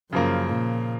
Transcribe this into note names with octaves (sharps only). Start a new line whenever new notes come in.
F#2 C#3 F3 A#3
A#2